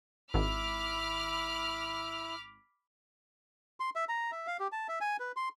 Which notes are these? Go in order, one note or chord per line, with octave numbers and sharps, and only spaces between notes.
G#1 E4 B5 D6 E6 F6
C6
E5
A#5
E5
F5
G4
A5
E5
G#5
B4
C6